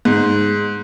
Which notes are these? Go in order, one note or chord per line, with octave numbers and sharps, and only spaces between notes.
G#2